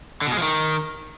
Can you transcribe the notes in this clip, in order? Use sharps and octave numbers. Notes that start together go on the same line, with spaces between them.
D3
B2
G#3
F3
D#3